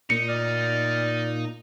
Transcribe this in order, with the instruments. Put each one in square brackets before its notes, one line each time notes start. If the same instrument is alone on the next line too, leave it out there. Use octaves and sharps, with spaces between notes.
[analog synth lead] A#2 [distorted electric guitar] D#4 [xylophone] C#7
[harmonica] D5 F6